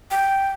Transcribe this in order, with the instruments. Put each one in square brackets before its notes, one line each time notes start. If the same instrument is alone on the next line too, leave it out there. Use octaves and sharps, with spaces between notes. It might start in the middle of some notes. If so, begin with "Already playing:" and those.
[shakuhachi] G5